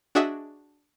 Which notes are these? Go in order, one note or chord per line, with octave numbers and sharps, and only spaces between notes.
D4 F#4 G#4 D#5 E5